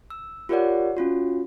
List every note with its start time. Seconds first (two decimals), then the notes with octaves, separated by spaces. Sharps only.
0.10 E6
0.49 F4 G4 A#4 C#5 D5 F#5
0.97 C#4 F4 F#4